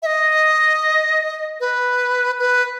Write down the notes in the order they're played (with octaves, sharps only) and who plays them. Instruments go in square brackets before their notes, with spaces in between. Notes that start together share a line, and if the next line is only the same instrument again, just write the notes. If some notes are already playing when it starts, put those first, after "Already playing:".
[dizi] E5
D#5
B4
B4